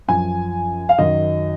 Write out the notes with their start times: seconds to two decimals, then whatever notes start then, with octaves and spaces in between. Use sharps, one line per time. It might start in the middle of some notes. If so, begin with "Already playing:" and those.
0.08 F#2 F3 G#5
0.89 F5
0.98 F#2 D#3 F#3 D#5